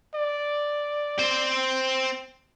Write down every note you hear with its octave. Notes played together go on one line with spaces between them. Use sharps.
D5
C4 C5